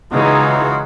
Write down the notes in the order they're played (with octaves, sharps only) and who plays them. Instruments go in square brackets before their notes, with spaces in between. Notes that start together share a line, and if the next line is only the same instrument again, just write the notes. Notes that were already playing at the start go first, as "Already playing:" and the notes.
[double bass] C#3 G#3 [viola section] E3 D#4 [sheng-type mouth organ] F4 F#4